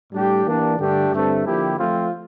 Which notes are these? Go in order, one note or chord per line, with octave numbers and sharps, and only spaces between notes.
A2 G3 D4 G4
E3 A#3 D4 G4
G2 D3 A3 D4 G4
G2 D3 A3 C4
D3 F3 A#3 E4 G4
F3 A3 C4 F4